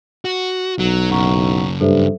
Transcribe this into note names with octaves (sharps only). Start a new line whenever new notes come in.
F#4
B1 F#3
F#2 C#3 F#5 A#5 C#6
G2 A4 C5 E5